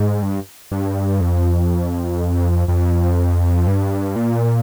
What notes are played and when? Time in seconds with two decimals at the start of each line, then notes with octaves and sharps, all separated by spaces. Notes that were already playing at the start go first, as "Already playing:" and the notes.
Already playing: G#2
0.22 G2
0.72 G2
1.21 F2
2.68 F2
3.67 G2
4.16 A#2